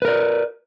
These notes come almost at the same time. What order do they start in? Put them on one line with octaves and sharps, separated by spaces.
B4 A#4 D5